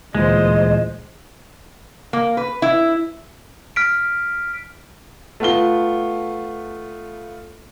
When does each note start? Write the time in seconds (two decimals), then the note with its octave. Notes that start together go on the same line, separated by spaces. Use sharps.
0.15 D2 A#2 E3 G#3 C5 D#5
2.13 A#3
2.37 B4
2.62 E4
3.76 F6 B6 D7
5.40 A3 B3 F4 G7